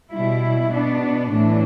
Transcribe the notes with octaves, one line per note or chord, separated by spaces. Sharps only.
B2 G3 E4
B2 B3 D4
A2 E3 A3 D4